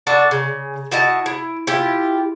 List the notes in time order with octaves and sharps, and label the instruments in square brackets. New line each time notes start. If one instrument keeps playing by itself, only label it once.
[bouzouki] D4 F#4 A4
C#3
E4 F#4 D#5 A5
E4
E4 F4 G4